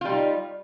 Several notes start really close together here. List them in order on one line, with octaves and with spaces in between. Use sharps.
F4 G3 D#4